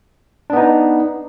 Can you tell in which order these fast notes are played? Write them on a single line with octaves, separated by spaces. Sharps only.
D4 B3 D#4